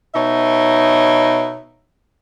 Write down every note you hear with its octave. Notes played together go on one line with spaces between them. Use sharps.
B2 D#4 C#5 E5